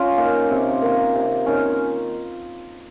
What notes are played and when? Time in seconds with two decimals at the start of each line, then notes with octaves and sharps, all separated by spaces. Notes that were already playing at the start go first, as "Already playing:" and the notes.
Already playing: C#4 F4
0.17 D#3 A#3
0.50 C3
0.81 D#3 A#3
1.14 C3
1.46 D#3 A#3 C#4